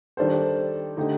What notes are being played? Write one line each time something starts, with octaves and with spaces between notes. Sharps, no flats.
D#3 G3 D4 A4 C5
D3 A3 D#4 G4